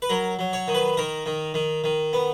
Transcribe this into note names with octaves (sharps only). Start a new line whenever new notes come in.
B4
F#3 A#4
F#3
C#5
D#3
B4
D#3 A#4
D#3
D#3
D#3
B3